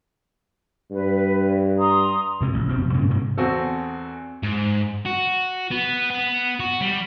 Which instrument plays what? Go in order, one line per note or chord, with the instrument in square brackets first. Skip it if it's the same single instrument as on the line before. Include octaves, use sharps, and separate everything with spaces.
[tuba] G2 [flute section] B4
[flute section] A#5 C6 D#6
[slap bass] D2 C3 G#3
A1
F1 B2 C4
D2 G2 C#3 A#3
G#2 C3 G#3 A#3
[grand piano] E2 C4 F#4 A4
[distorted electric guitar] G#2
F#4
B3
B3
F#4
G3